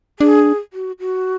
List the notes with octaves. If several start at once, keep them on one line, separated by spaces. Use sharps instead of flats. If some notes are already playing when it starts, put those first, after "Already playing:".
D4 G#4
F#4
F#4